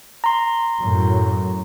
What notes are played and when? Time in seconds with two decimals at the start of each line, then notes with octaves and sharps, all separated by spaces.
0.24 A#5 C6
0.80 F#2 A2